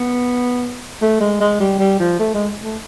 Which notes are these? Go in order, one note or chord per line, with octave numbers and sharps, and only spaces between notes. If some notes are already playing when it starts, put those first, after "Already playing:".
Already playing: B3
A3
G#3
G#3
G3
G3
F3
A3
G#3
A3